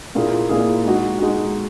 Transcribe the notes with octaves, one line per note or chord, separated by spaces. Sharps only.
A#2 A#3 E4 G#4
A#2 A#3 E4 G#4
G#3 D#4 F#4
G#3 D#4 F#4